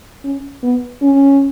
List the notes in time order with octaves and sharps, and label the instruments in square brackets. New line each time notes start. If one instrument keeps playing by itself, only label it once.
[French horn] C#4
B3
C#4